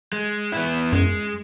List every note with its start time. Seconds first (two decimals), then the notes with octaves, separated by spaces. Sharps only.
0.13 G#3
0.52 B3 E4
0.92 F#2 G#3